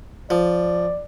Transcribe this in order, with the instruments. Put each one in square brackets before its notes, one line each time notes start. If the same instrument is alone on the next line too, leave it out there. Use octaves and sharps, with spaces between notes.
[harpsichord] F3 [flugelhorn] D5